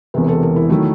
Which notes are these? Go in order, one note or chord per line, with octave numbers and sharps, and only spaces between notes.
E1 E2 C3 B4
A4
A#4
E4
D#3 F#3 A3 E4